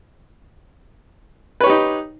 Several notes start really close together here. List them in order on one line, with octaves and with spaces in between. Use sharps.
B4 C#5 G4 D#4